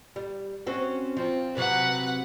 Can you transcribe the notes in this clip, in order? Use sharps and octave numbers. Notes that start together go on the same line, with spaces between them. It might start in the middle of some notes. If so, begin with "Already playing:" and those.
G3
C4 C#4 F#4
F3 C4
C3 F#3 B4 F#5